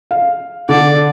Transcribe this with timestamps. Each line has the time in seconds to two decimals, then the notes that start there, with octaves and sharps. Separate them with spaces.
0.11 F5
0.69 D3 D5